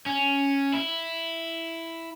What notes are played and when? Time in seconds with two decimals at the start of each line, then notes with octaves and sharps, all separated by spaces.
0.06 C#4
0.73 E4